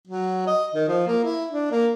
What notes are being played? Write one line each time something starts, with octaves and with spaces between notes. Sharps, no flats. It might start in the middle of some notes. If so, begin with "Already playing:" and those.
F#3
D#5
D#3
F3
A#3
E4
D4
A#3